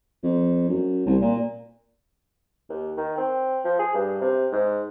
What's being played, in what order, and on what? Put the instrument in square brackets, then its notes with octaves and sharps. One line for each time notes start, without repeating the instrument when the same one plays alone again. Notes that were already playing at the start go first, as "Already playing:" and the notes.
[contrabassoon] F2
F#2
C2
A#2
[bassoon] D#2
D#3
C4
F3
G#4
G2
C3
G#2